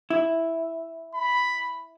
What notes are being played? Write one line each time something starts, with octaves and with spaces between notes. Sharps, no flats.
E4
B5